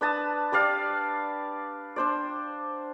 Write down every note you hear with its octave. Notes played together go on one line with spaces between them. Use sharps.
D4 B4 A5 D#6
G4 B4 D5 F5
D4 C5 D5